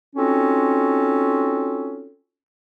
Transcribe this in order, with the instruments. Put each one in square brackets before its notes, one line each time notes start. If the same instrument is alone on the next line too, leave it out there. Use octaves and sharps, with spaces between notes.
[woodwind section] C4 C#4 D#4 F4 F#4 A4